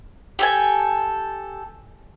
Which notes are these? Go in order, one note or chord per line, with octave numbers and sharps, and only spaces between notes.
G4 A4 G#5